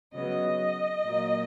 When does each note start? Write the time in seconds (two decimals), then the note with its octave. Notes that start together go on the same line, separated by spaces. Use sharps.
0.13 C#3 F#3 B3 D#5
1.03 A#2 F#3 A#3